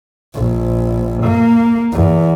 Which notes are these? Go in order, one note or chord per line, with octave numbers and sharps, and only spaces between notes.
A#1
A#3
E2